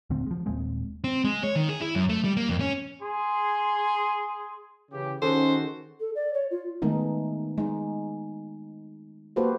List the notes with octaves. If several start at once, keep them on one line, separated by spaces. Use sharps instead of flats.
D#1 D2 D3 C4
F3 G#3
D#1 A#2 G#3 C4
C4
G#3
C#5
D#3
G#4
E4
F#2
A3
G3
A#3
F2
C#4
G#4 C6
C#3 E3 G4
D#3 C#4 F#4 G#4 A4 C5
A4
D5
C#5
F4
D#3 G#3 A3 B3 D#4
G#3 D#4
A#3 F#4 G4 A4 B4 C5